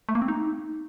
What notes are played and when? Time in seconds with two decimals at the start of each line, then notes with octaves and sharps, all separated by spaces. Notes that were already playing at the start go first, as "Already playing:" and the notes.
0.09 A3
0.15 A#3
0.22 C4
0.28 D#4